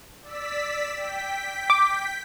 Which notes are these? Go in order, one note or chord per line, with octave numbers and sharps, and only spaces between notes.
D5 E6 B6
G5 B6
D6